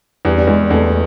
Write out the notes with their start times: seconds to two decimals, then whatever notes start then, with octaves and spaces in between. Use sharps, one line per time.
0.25 E2 G3
0.37 G3
0.47 E2 G#3
0.70 E2 A3